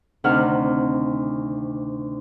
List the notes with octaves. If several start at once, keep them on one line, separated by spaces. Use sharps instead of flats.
D2 C3 D#3 F#5 F6